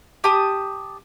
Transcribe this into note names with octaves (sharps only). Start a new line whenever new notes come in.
G4 A5 D#6